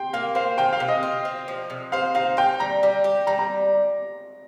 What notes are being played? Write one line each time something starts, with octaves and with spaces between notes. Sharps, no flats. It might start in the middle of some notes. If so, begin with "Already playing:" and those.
Already playing: G5 C6
A#3 F5
C5 F5
D#3 G5
F5
C3
D#5
F4
C4
F3
C3
C5 F5
D#4 F5
D#4 G5
G3 A#5
G3
G4
G3 A#5
A#5